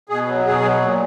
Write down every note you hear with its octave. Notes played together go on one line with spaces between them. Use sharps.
B2 G#4
F#3
B2 G#4
F#3
A#2